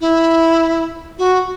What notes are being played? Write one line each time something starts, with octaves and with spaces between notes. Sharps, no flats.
E4
F#4